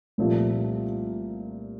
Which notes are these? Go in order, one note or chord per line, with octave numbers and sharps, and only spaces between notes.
C2 A#2 F3 A3